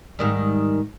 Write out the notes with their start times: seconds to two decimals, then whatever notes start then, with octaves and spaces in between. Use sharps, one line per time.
0.19 G#2 D#3 G3